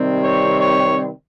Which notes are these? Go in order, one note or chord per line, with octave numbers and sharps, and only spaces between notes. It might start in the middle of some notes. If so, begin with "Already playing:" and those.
Already playing: C3 D#3 G3 C4
C#5
C#5